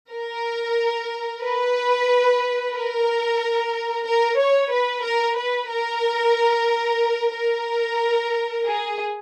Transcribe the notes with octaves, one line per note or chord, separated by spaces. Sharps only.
A#4
B4
A#4
A#4
C#5
B4
A#4
B4
A#4
A#4
G#4